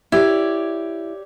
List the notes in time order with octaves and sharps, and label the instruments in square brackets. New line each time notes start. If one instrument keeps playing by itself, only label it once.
[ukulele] E4 [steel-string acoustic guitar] G4 C#5 D5